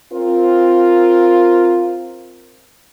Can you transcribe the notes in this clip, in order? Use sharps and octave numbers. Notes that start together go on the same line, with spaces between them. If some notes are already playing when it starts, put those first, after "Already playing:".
C4 F4 A#4